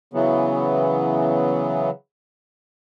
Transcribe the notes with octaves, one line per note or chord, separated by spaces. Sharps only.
C#3 E3 F#3 B3